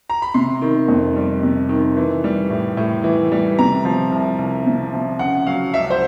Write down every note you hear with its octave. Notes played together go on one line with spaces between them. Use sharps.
A#5
B5
C3 C6
D#3
F2
G3
C3
D#3
E3
G3
A2
A2
E3
G3
C3 A#5
F3
C2
C2
C3
F3
C#3 F#5
F#3 F5
C#2 E5
C5